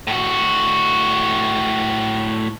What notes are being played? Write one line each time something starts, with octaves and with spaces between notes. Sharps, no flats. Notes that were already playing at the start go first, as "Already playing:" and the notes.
A2 F#4